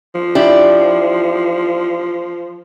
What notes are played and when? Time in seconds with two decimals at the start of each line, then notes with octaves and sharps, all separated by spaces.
0.15 F3
0.35 D4 E4 G4